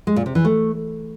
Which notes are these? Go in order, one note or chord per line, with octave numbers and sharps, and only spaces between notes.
G#3
A#2
C3
E3
A3